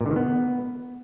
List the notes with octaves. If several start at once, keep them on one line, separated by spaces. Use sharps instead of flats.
A#2
D3
D#3
B3